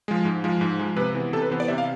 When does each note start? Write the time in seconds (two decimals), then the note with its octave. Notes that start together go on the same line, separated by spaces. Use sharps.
0.08 F3 G#3
0.25 G#2
0.44 F3 G#3
0.61 G#2
0.80 F3 G#3
0.96 C3 B4
1.15 E3 B3
1.33 C3 A4
1.42 B4
1.50 E3 B3 C5
1.60 D5
1.68 C3 E5
1.78 F5